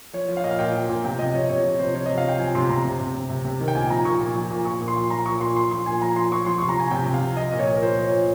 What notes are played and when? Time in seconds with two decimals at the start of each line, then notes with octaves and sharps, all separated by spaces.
0.13 F3 C#5
0.28 F3
0.37 F5
0.44 A#2 D#5
0.51 F5
0.59 A#2 G5
0.74 F3
0.89 A#2
1.04 C3 G5
1.19 C3 D#5
1.35 F3 C#5
1.49 C3 C#5
1.64 F3
1.79 C3 C5
1.94 F3 C#5
2.06 C3 D#5
2.18 F5
2.25 F3 G5
2.39 F3 G#5
2.55 C3 C6
2.70 C3 A#5
2.85 C3
3.00 C3
3.16 C3
3.30 C3
3.45 C3
3.60 D#3
3.68 G5
3.75 A#2 G#5
3.90 F3 A#5
4.05 A#2 C#6
4.20 A#2
4.36 F3
4.51 A#2
4.65 A#2 C#6
4.81 A#2
4.88 C6
4.96 F3
5.10 F3 A#5
5.25 A#2 C#6
5.41 A#2 C6
5.56 F3 C6
5.71 F3 C6
5.86 A#2 G#5
6.01 F3 A#5
6.16 F3 C6
6.32 F3 C#6
6.46 F3 C6
6.58 C3 C#6
6.69 A#5
6.77 F3 G#5
6.91 C3 G5
7.06 C3
7.14 F5
7.22 F3
7.37 F3 D#5
7.52 A#2
7.59 C#5
7.67 A#2
7.77 A#4
7.82 A#2 C5
7.98 F3
8.04 C#5
8.12 A#2